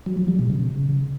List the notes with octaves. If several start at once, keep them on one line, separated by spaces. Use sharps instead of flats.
F#3
F3
G3
B2
C#3